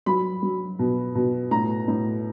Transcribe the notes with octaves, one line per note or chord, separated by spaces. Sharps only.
F#3 B5
F#3
B2
B2
A2 A#5
A2